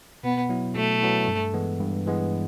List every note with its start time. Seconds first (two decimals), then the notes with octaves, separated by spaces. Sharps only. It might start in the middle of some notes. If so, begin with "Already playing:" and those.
0.24 B2 B3
0.49 F#3 B3 E4
0.75 B2 A3
1.02 F#3 B3 E4
1.28 G2
1.54 E3 G#3 B3
1.79 G2
2.06 E3 G#3 B3